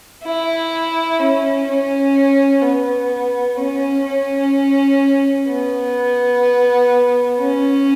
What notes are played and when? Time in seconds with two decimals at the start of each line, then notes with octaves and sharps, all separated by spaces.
0.23 E4
1.20 C#4
1.66 C#4
2.62 B3
3.57 C#4
4.05 C#4
5.48 B3
7.39 C#4